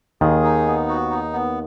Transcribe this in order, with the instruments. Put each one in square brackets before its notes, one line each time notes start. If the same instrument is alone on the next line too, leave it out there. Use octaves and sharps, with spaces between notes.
[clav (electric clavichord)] D#2 D#3 [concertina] G#4
[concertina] D#4
B3
F#4
D#4
B3